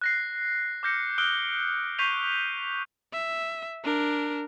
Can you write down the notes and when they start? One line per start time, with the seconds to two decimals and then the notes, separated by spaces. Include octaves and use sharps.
0.01 F#6 A#6 C7
0.83 D6 F6 G6 A#6 C#7
1.18 D#6 F6 F#6 D7 G7
1.99 C#6 G6 B6 C7 D#7 F7
3.13 E5
3.84 D4 A#4